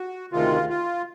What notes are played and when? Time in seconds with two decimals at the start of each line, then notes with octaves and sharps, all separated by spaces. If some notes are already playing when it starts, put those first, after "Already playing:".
Already playing: F#4
0.32 D2 C3 D#3 G#3 F4
0.69 F4